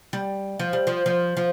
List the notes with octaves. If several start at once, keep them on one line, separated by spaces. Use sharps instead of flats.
G3
F3
G3
F3
F3
F3